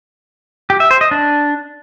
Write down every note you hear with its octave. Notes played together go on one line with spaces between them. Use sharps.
G4
E5
C5
D#5
D4